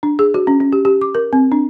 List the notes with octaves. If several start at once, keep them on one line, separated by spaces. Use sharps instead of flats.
D4
G#4
F#4
C#4
C#4
G4
G4
D6
A#4
C4
D4